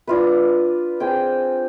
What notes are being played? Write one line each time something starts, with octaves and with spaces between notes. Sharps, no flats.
D4 F4 B4
C4 G#4 G5